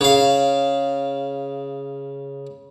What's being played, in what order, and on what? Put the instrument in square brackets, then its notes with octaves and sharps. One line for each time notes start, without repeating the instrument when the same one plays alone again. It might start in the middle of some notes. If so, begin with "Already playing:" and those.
[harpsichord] C#3 F5